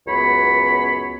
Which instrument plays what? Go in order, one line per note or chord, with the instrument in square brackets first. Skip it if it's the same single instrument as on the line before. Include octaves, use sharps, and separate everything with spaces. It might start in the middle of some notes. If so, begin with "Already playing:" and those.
[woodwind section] C#2 F#2 B3 B4 C#5 B5